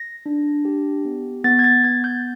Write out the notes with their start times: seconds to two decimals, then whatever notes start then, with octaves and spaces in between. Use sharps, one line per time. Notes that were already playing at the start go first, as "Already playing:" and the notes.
Already playing: A#6
0.26 D4
0.65 G4
1.05 B3
1.44 B3 A6
1.59 G#6
1.64 A6
1.84 B3 G#6
2.04 G6